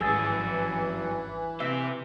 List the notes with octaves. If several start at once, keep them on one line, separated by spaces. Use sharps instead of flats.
G#1 G2 E3 C#4 G#4 E6 A6
C3 G4 E5